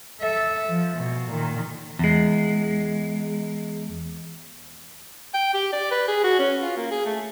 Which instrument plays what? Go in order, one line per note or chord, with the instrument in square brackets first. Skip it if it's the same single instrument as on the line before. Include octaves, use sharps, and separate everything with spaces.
[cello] A4 E5
F3
B2
A#2 D#3
[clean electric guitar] E2 G#3
[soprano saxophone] G5
G4
D5
B4
G#4
F#4
C#4
F4
A#3
G#4
A3